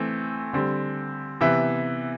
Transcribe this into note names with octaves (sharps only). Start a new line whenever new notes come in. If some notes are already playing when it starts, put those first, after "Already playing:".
Already playing: E3 A3 C4
D3 G3 C4
C3 E3 B3 E5